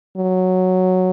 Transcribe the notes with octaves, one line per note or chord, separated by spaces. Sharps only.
F#3